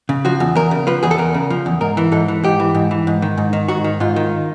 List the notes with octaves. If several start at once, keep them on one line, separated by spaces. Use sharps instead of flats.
C#3
F3 F#4
E2
E2 A#4
C#3
F3 B4
E2 G#4
A4
E2 A#4
C#3
F3
E2
G#2 A#4
E3
G#2 A4
E3
G#2 G4
E3
G#2
E3
G#2
D#3
G#2
D#3
G#2 F#4
D#3
G#2 F4
D#3